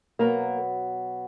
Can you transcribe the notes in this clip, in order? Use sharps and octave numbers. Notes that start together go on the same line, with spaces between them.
B2 F#3 A#3 B3 A#4